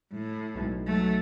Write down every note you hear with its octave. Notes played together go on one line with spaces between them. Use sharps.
A2
B1
F#3 A3